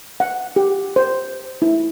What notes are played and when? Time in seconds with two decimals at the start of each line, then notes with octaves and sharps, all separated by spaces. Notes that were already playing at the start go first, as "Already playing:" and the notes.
0.20 F#5
0.56 G4
0.96 C5
1.62 E4